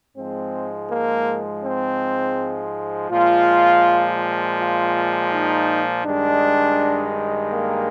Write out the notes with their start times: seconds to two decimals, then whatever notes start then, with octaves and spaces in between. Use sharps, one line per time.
0.16 G#2 F3 G#3 C4
0.90 A#3
1.64 C4
3.10 A#2 F3 G#3 F4
4.58 F4
5.31 D#4
6.05 G2 D#3 G#3 D4
7.52 A#3